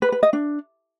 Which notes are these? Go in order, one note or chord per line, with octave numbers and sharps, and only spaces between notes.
B4
B4
D#5
D4